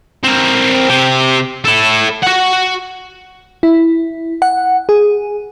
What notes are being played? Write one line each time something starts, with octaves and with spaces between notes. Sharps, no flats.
C4 A#4
C3 G4
E4 A4
F#4 F#5
E4
F#5
G#4